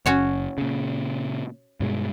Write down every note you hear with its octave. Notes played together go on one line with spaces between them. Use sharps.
F#1 C#4 F#4 C#5
A#2 C#3
G2 B2 G#3